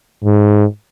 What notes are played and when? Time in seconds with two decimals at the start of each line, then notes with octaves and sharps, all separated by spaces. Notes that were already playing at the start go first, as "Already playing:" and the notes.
0.24 G#2